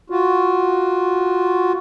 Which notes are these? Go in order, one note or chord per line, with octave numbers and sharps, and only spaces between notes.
F4 F#4